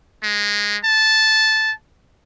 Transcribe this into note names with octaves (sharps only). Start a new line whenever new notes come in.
G#3
A5